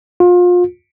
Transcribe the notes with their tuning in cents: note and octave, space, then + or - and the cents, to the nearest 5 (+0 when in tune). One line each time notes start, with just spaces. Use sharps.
F4 +30